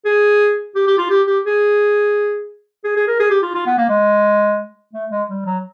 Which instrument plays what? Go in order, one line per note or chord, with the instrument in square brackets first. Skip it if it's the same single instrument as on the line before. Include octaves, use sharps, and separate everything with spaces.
[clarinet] G#4
G4
G4
F4
G4
G4
G#4
G#4
G#4
A#4
G#4
G4
F4
F4
B3
A#3
G#3
A3
G#3
G3
F#3